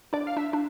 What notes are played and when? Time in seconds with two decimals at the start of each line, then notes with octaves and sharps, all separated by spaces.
0.13 D4 D5
0.27 F5
0.37 D4 E5
0.53 D4